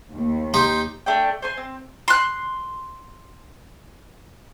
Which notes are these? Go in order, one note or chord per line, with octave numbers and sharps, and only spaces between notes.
D#2
D#4 G4 C6
A3 D4 D5 G5
C5 G#5 C6
C4
C6 F#6